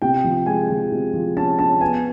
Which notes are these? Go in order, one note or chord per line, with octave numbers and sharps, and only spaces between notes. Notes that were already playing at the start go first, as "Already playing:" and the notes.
C3 G5
F3
G#3 G#5
F3
C3
F3
C#4 A5
C#4 A5
B3 G#5